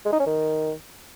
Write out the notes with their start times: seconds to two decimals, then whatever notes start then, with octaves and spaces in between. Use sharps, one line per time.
0.06 G#3
0.13 D#4
0.20 C#4
0.27 D#3